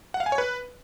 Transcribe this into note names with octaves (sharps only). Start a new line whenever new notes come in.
F#5
F5
G#5
C#5
B4